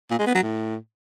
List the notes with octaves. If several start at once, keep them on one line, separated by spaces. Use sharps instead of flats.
A#2
G#3
B3
F#3
A2